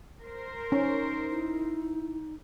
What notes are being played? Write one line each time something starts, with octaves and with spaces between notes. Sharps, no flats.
A#4 C5
C#4 D#4
E4